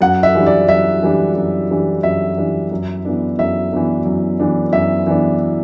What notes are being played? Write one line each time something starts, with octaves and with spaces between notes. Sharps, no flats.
F#2 F#5
E5
E3 G3 D4
D5
F#2 E5
E3 G3 D4
F#2
E3 G3 D4
F#2 E5
E3 G3 D4
F#2
E3 B3 D4
F#2 E5
E3 B3 D4
F#2
E3 B3 D4
F#2 E5
E3 B3 D4